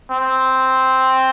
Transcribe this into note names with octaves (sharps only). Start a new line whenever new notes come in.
C4